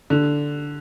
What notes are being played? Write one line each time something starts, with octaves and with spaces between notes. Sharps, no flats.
D3